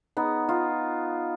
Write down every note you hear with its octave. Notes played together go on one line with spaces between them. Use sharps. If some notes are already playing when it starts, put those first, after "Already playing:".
B3 D#4
F4